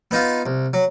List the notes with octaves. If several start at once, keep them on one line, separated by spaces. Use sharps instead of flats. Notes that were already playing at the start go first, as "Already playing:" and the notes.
B3 D#4 F4
C2
F#3